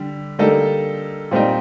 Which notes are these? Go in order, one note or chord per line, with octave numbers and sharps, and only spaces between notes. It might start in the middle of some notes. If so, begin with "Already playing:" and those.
Already playing: D3 G3
D3 G3 A#3 D#4 A4
A#2 G3 C4 D#4